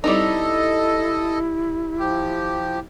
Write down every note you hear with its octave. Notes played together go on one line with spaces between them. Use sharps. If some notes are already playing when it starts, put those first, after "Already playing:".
G3 C4 D#4 E4 A4 D#5
F3 G4